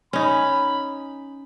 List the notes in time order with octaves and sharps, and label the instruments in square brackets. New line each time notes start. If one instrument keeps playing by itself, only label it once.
[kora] C#4 D#4 [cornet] B5